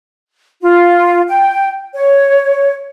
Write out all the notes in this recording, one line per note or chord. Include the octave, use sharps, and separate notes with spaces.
F4
G5
C#5